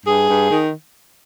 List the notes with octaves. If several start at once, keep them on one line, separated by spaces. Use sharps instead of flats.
G2 G#4
G2
D#3